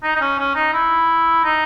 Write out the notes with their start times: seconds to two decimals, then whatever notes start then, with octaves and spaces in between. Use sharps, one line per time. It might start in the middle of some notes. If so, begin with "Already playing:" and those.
0.03 D#4
0.15 D#4
0.21 C#4
0.39 C#4
0.55 D#4
0.73 E4
1.44 D#4